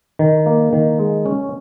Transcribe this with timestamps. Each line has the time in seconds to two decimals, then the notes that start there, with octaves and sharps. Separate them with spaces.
0.19 D#3
0.46 A#3
0.73 D#3
0.99 G#3
1.26 C#4